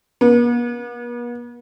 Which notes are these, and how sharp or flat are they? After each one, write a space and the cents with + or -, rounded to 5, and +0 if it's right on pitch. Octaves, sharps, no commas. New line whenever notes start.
B3 -45